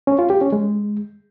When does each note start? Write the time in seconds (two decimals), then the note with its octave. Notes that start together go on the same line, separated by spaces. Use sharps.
0.07 C#4
0.19 F4
0.30 G4
0.41 C#4
0.52 G#3